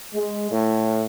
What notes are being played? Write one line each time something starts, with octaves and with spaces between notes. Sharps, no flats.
G#3
A2